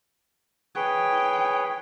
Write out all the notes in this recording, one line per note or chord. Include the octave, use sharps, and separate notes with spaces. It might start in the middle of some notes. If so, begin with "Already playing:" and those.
G#4 B4 C#5 G5